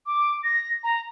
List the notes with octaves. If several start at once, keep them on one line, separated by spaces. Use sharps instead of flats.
D6
A#6
A#5